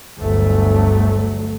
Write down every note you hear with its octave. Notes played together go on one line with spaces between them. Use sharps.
G1 D2 F#3 A3